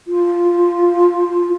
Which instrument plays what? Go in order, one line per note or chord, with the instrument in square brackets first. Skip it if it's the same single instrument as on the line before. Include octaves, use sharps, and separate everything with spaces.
[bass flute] F4